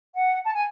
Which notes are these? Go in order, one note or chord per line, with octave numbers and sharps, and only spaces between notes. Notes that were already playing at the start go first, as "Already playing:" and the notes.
F#5
A5
G#5